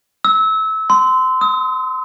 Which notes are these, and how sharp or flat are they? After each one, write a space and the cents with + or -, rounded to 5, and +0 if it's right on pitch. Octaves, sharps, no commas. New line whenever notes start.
E6 -25
C6 -25
D#6 +40